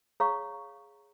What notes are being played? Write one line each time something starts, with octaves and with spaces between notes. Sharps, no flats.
G#4 C#5 F5 A#5 C#6